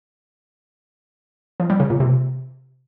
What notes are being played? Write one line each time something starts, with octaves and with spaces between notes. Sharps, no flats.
F3
G3
C#3
A#2
C3